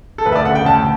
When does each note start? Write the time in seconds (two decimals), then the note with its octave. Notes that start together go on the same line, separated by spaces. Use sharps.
0.18 A4
0.26 D2 B4
0.32 E5
0.36 D5
0.45 C#3 F#5
0.55 G5
0.65 D2 A5